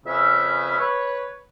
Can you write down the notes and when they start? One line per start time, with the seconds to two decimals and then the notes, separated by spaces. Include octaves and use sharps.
0.06 F2 C#3 C#4 B4 E5 E6
0.78 B4 C#5